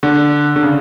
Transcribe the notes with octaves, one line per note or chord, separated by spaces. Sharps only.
D3
D3
C#3